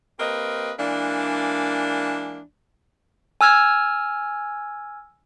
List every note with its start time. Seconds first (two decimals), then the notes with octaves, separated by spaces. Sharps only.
0.20 A#3 C4 G4 A#4 B4 D#5
0.79 E3 G#3 A#3 D4
3.41 G#5 E6 F6 G#6